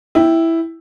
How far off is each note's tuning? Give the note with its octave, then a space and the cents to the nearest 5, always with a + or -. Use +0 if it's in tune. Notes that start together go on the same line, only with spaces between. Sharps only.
E4 +0 G5 +0